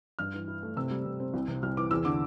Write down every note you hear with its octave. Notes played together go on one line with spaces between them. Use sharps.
G2 F6
E3
E4
A3
C3 E6
G3
C3
C4
C2
C3
C2 F6
E3 D6
E2 E6
D3 D6